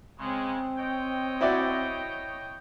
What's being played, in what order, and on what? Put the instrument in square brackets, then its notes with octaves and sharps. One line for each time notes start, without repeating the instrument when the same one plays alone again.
[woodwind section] C#3 G#3 [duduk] C4
[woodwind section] C#5 D#5 G5
[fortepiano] E4 F#4 D5